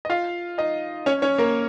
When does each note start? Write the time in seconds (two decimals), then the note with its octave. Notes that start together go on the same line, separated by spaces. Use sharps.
0.05 D#5
0.10 F4 F5
0.58 D#4 D#5
1.06 C#4 C#5
1.22 C#4 C#5
1.38 A#3 A#4